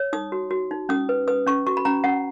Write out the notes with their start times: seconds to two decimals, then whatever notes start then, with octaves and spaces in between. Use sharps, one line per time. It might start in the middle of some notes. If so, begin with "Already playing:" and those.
Already playing: C#5
0.13 D#4 D#6
0.32 F#4
0.51 F#4
0.71 D#4
0.89 C#4 D#6
1.09 B4
1.28 B4 D#6
1.46 C#4 C#6
1.67 F#4 C#6
1.77 B5
1.85 C#4 A#5
2.04 C#4 F#5